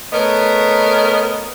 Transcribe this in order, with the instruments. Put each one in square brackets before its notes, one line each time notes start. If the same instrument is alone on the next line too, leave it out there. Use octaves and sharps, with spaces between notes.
[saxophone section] A3 B3 A#4 C#5 D#5